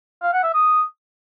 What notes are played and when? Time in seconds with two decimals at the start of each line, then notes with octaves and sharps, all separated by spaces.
0.23 F5
0.33 F#5
0.43 E5
0.54 D#6